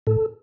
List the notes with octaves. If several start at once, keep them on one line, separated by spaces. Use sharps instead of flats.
A2 A4